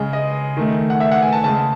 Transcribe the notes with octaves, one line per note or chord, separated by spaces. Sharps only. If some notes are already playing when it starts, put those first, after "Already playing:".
Already playing: C#3 G#3
D#5
D#3 A3
F#5
E5
F#5
G#5
A5
C#3 G#3 A5